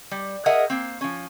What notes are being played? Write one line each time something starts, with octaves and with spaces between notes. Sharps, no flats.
G3
G#4 A#4 D#5 E5 F#5
A#3 C4
F3 C#4